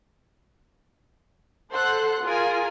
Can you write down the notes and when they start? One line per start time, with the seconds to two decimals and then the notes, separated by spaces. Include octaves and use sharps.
1.72 A4 C5 F#5 C6 F#6
2.23 F4 G#4 A#4 G#5